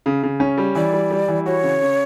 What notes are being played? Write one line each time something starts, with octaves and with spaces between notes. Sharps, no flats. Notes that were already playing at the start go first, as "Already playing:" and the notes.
C#3
C#3
C#4
G3
E3 D5
G3
G3
E3
F#4 C#5
C#3
C#3